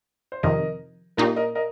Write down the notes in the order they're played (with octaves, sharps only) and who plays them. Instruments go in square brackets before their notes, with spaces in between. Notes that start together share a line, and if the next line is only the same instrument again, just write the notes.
[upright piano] C5
[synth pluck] F2 C3 D#3 [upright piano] A#4 D#5
[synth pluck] A#2 A#3 D#4 G4 [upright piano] F4 A#4
[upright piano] A#4 D#5
A#4 D#5